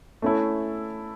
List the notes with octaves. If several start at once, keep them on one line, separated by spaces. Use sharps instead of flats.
A3 C#4 E4 A4